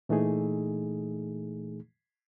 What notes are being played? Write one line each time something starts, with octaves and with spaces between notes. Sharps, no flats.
A#2 E3 A3 D#4 G#4